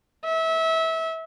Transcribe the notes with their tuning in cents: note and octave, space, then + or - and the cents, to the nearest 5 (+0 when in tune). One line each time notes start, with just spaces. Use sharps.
E5 -25